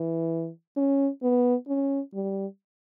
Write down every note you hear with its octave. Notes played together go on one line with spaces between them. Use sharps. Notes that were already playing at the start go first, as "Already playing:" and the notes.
Already playing: E3
C#4
B3
C#4
G3